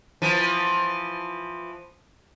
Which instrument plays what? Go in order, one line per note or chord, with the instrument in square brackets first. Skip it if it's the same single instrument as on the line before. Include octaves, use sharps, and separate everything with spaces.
[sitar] E3 F3